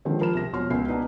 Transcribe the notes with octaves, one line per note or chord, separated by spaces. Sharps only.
D3 D#3 F3 G#3 C4 C#4
F3 A#4 B5 F6 E7
C2 A#6
E1 F3 F#4 C#5 C6 F6
C#2 B2 A#4 C7
B3 D4 D#4 B4